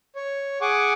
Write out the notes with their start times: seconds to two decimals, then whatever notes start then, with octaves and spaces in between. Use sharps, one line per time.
0.16 C#5
0.61 G#4 F#5 G#5 C#6 D6